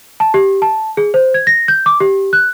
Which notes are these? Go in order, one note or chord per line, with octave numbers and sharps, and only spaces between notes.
A5
G4
A5
G#4
C5
G#6
A#6
G6
D6
G4
F#6